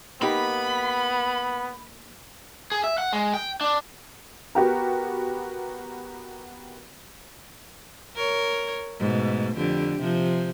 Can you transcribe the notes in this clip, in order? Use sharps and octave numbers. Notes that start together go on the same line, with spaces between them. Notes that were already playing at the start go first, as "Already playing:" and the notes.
A#3 B3 D#4 G4 B5
G#4
E5
F#5
G#3
G5
D4
B3 F#4 G4 A#4
A#4 C#5
G#2 B2 A3
F2 D3 G4
C3 F3